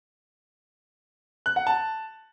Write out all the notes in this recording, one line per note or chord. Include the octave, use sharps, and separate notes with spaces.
F#6
F#5
A5